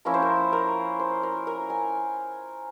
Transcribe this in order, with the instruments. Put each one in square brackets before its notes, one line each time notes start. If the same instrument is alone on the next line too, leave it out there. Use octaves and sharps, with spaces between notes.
[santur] F3 A#3 C#4 E4 A#4
C5
A#4
A#4
C5
A#4
A#4
G#5